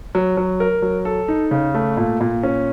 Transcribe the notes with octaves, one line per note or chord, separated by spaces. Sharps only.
F#3
F#3
A#4
F#3
A4
D#4
C#3
A3
A#2
A#2
C#4